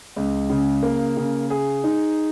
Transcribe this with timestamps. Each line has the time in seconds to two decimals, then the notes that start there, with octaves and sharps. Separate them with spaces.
0.16 C#2
0.50 C#3
0.83 A#3
1.17 C#3
1.50 G#4
1.84 D#4